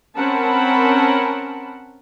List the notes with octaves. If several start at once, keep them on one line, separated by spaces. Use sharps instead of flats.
C4 C#4 A#4 F#5 A5 B5